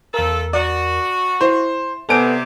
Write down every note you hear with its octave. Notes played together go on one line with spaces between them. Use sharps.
E2 A3 F4 A4 A#4
F#4 D5
E4 C5
C3 B3 A4 D5 G#5 D7